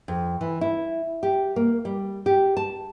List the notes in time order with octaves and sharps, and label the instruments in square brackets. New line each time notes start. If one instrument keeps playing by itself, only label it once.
[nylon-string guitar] F2
E3
E4
G4
A#3
G3
G4
A5